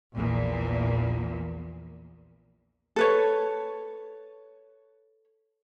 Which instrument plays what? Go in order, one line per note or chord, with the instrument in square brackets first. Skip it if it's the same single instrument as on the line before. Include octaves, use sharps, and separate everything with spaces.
[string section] A#1 E2 A#2
[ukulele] A4 B4 C#5